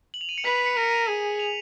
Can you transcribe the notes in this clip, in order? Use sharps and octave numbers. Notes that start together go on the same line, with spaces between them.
F#7
F7
D#7
C#7
B4 B6
B6
C#7
A#4 D#7
C#7
D#7
G#4
F7